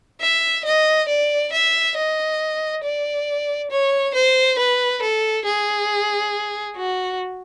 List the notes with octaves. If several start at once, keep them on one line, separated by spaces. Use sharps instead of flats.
E5
D#5
D5
E5
D#5
D5
C#5
C5
B4
A4
G#4
F#4